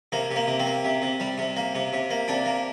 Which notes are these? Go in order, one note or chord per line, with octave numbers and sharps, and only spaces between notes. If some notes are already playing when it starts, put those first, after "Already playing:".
C3 A#3
C3
A#3
C3
C4
A#3
C3
C3
G3
C3
A#3
C3
C3
A#3
C3 D4
A#3